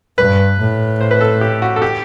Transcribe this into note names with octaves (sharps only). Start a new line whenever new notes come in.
G2 B4
A2
C5
B4
A4
G4
F#4
A4
G4